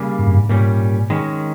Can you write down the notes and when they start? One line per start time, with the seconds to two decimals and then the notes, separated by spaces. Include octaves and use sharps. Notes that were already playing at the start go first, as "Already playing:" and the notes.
Already playing: C#3 G3 A#3
0.19 G#2
0.27 G2
0.34 G#2
0.49 A#2 G3 C#4
1.10 D#3 G#3 C#4